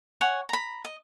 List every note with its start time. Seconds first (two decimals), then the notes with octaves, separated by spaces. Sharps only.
0.21 C#5 F#5 G#5
0.49 A#5 B5
0.85 D#5